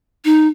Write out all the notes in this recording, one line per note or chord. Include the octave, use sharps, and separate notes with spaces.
D#4